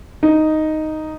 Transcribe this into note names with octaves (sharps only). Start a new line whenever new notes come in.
D#4